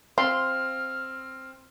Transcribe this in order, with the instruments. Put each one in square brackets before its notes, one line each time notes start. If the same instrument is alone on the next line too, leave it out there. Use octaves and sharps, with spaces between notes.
[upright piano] C4 [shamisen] F4 [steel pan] C6 [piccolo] F6